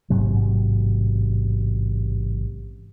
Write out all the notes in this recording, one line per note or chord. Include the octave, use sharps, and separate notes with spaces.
A1 G#2 C3 F#3